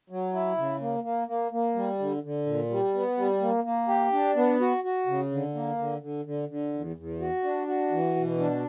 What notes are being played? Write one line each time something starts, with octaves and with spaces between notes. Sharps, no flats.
F#3
E4
C#3
A#3
A#3
A#3
A#3
G3
D3
D3
A#2
G3
B3
G3
A#3
A#3
G4
D4
B3
F#4
F#4
C#3
D3
A#3
D3
D3
D3
D3
E2
E2
F#4
D4
F#4
E3
B2
D4